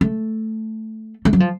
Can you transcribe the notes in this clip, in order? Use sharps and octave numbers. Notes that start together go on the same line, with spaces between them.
A3
A3
F#3
F3